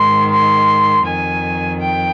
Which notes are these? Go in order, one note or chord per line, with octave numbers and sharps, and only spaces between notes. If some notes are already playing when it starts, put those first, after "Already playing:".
Already playing: G#2 D#3 C6
C6
F2 D#3 G#5
G5